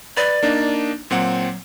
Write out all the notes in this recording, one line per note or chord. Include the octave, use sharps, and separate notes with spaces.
B4 D5
A#3 D4 D#4
A#2 F#3 C4 F#5